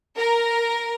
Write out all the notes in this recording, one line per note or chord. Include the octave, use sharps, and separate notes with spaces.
A#4